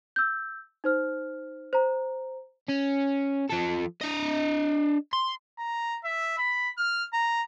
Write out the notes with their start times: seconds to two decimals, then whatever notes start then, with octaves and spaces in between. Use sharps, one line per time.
0.16 E6 G6
0.84 D#4 C5 F6
1.73 C5 A#5
2.68 C#4
3.49 F3 A4
4.01 D4 D#5
5.13 C6
5.59 A#5
6.04 E5
6.38 B5
6.78 F6
7.13 A#5